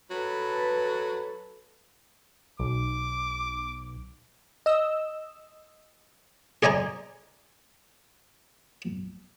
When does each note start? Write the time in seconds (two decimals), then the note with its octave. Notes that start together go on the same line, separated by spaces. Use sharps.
0.10 F#3 A4 B4
2.60 B1 D6
4.66 D#5 E6
6.63 G#4 D5 D#5 G#5 A#5